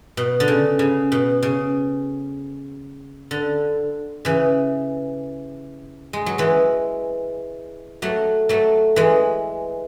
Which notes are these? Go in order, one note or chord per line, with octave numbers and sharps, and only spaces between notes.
B2
D3
C#3
C#3
B2
C#3
D3
C#3 E3
G#3
F#3
E3 G#3
F#3 A3
F#3 A3
E3 G#3